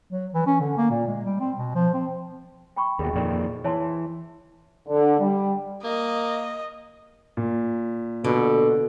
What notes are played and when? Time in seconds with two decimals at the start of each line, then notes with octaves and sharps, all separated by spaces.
0.12 F#3
0.34 E3
0.47 C#4
0.60 D3
0.78 A#3
0.91 A#2
1.07 G#3
1.25 G3
1.40 C4
1.57 B2
1.75 F3
1.94 C4
2.76 G5 B5 C#6
2.99 D#2 B2 G#4 D#5 G5
3.13 F2 A#2 D#3
3.65 E3 C#5 A5 C6
4.88 D3
5.19 G3
5.84 A#3 D#5
7.37 A#2
8.24 B2 D3